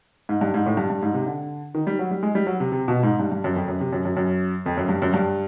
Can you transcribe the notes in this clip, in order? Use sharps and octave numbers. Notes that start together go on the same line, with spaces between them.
G#2
G2
G#2
A2
G2
G2
G#2
C3
D3
D#3
G3
F#3
G3
G#3
G3
F#3
C3
C3
B2
G#2
G2
G2
F#2
F2
F#2
C3
F#2
F#2
F#2
F2
F#2
G2
F#2
G2